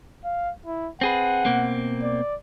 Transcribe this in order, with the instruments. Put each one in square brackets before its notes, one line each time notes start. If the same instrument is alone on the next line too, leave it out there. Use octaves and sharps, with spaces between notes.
[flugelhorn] F5
E4
[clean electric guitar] C4 G#4 B4 [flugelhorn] F#5
[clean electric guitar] B2 A#3 C4
[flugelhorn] D5